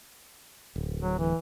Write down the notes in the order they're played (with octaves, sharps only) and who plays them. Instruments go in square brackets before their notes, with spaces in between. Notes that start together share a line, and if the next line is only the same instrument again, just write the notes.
[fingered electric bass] D1
[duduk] F#3
E3